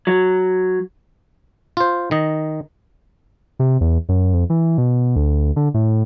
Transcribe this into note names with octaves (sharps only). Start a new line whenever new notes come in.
F#3
F4 C5
D#3 D#5
C3
E2
F#2
F2
E3
B2
D2
D3
A2